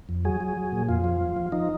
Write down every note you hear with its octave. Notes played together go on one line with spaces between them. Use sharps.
F2
F#3 G#4
F#3
F#3
A#2
F2 F4
F3
F3
F3
F3 D#4